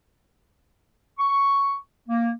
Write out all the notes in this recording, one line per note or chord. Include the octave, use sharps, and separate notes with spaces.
C#6
A#3